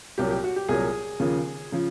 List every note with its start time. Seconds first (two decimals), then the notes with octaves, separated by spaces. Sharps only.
0.18 C2 A#2 F#3 G4
0.30 G4
0.44 F#4
0.56 G4
0.69 C2 A#2 F#3 G#4
1.20 D#2 C#3 F3
1.72 C#3 F3